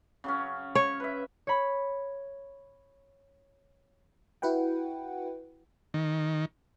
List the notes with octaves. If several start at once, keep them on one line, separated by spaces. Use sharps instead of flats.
C#3 F#3 C#4
C#5
B4 E5
C#5 B5
E4 F#4 B4 F#5 G5
D#3